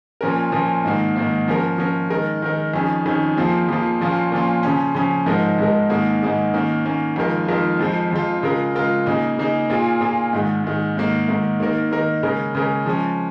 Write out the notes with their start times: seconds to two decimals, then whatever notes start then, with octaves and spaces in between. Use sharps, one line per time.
0.21 A#2 F3 C#4 A#4
0.52 A#2 F3 C#4 A#4
0.84 G#2 D#3 A#3
1.16 G#2 D#3 A#3
1.48 F3 C#4 A#4
1.78 F3 C#4 A#4
2.10 D#3 G#3 D#4 A#4
2.42 D#3 G#3 D#4 A#4
2.74 F2 D#3 C#4 G#4
3.06 F2 D#3 C#4 G#4
3.37 F2 F3 A#3 F4 G#4
3.69 F2 F3 A#3 F4 G#4
4.01 A#2 F3 A#3 C#4 F4
4.32 A#2 F3 A#3 C#4 F4
4.63 C#3 F3 C#4
4.95 C#3 F3 C#4
5.26 G#2 F3 G#3 D#4 A#4
5.59 G#2 F3 G#3 D#4 A#4
5.90 G#2 D#3 A#3 D#4 G#4
6.22 G#2 D#3 A#3 D#4 G#4
6.54 D#3 A#3 C#4
6.85 D#3 A#3 C#4
7.16 F2 D#3 G#3 F4 A#4
7.48 F2 D#3 G#3 F4 A#4
7.79 F2 F3 G#3 F4
8.11 F2 F3 G#3 F4
8.43 C#3 G#3 F4 A#4
8.75 C#3 G#3 F4 A#4
9.06 C#3 A#3 D#4 G#4
9.38 C#3 A#3 D#4 G#4
9.70 A#2 A#3 F4 G#4
10.01 A#2 A#3 F4 G#4
10.33 G#2 D#3 G#3
10.64 G#2 D#3 G#3
10.97 G#2 D#3 A#3
11.28 G#2 D#3 A#3
11.60 D#3 A#3 D#4 A#4
11.91 D#3 A#3 D#4 A#4
12.23 C#3 G#3 C#4 A#4
12.55 C#3 G#3 C#4 A#4
12.86 F3 G#3 C#4